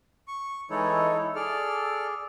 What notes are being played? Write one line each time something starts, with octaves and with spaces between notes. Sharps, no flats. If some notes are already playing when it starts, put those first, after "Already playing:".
C#6
E3 G#3 D#4 E4 A4 C#5
E4
G#4 A4 D5 F6